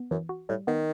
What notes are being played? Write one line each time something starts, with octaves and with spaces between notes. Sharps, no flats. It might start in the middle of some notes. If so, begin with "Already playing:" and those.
Already playing: B3
F#2 E3
F#4
A2 G3
D#3 B3